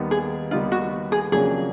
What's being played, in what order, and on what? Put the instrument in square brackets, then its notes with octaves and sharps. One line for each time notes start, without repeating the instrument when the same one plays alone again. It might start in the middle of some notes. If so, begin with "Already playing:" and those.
Already playing: [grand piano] D#2 D#3 G3 B3 D#4
[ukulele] G#4
[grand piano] D#2 D#3 G3 B3 D#4 [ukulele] F4
[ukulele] F#4
G#4
[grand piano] F2 C#3 F#3 A#3 D4 [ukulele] G#4